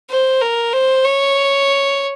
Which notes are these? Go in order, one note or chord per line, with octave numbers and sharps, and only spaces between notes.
C5
A#4
C5
C#5